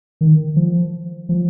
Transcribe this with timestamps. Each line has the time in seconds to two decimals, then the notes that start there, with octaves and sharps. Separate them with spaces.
0.21 D#3
0.56 F3
1.29 F3